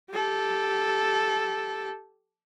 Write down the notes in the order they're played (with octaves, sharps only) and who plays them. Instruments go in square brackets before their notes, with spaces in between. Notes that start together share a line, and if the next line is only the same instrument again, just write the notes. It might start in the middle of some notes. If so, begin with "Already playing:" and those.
[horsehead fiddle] G4 A4